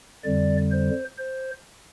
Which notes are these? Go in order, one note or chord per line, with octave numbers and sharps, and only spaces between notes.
F2 D3 G3 D5
C5
C5